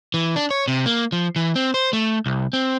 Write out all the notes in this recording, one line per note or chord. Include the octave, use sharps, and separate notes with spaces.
E3
D4
C#5
C3
A#3
F3
E3
C4
C5
A3
C2
C4